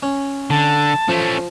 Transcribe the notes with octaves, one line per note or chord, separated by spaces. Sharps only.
C#4
D3 A5
F3 A3 C#4